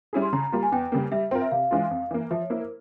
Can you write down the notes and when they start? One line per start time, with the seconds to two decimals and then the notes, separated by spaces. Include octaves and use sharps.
0.13 G3 C#4 E4 G#4
0.22 C6
0.33 C#3 A#5
0.52 G3 A#3 F4
0.63 G#5
0.72 E2 G5
0.92 C#3 G3 A#3
1.12 G3 E5
1.31 C4 F4 A#4 G5
1.42 E5
1.51 C3 F5
1.71 E3 G#3 C#4 F4
1.91 F2
2.11 E3 A#3
2.31 F3 E5
2.40 C#5
2.50 A#3 E4 C5
2.60 A#4